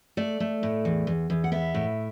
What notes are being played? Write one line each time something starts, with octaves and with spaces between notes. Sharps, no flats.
A3 D5
A3
A2
E2
E2
E2
F#5
B3 E5
A2